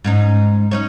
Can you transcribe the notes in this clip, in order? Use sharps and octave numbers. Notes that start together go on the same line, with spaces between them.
G#2 C#4 D#4
C#4 D#4 C#5